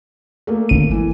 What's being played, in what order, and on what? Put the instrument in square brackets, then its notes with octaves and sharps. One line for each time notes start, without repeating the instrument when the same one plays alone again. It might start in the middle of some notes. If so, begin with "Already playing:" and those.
[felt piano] A3 A#3
[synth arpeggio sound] G#1 D#7
[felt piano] E3